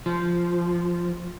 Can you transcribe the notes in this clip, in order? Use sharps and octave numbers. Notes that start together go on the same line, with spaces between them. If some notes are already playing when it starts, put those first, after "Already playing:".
F3